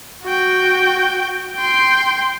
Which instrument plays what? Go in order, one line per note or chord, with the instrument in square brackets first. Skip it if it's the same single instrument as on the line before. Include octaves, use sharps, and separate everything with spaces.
[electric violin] F#4 G5
G5 C6